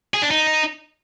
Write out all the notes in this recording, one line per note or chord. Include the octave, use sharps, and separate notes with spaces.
G#4
D4
D#4